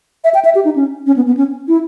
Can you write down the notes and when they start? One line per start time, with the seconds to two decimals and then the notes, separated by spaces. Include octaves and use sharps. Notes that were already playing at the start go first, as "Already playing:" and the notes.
0.24 E5
0.34 G5
0.45 E5
0.55 G4
0.65 D#4
0.76 C#4
1.06 C#4
1.16 B3
1.26 B3
1.37 C#4
1.68 E4